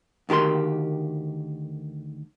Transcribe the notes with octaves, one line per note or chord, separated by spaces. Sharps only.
D2 D#3 G4 A#4 C6